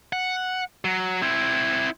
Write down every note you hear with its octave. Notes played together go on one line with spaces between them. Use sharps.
F#5
F#3
C4 E4